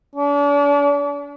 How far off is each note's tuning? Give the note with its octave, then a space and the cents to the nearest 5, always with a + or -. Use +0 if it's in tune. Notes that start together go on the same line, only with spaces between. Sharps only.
D4 -40